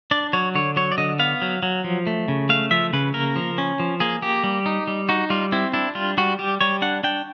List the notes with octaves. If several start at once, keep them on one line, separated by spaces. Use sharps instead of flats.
D4 D5
F#3 C#5
D3 C#5
F#3 C#5
D5
D3 D#5
B3 F5
F#3
F#3
F3
A3
C#3
A3 F5
F3 E5
C#3 B4
A#3 A#4
F3
C#4
F3
A#3 G#4
A#3 G4
G3
D#4
G3
D#4 F#4
G3 F4
C4 E4
D4 E4
G3 F4
G3 F#4
G3 G4
G3 C#5
D4 F#5
D4 G5